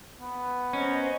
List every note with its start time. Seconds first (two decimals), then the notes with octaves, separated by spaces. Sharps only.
0.20 B3
0.73 C#4 C5 D#5 A#5